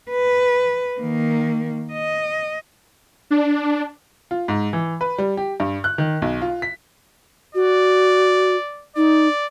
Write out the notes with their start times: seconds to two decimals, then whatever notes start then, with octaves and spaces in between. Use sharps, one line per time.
0.11 B4
1.00 D#3 A#3
1.93 D#5
3.31 D4
4.31 F4
4.48 G#2
4.73 E3
5.01 B4
5.18 G3
5.37 G4
5.60 G2
5.84 F#6
5.98 D#3
6.22 B1
6.42 F4
6.62 B6
7.55 F#4 D5
8.96 D#4 D5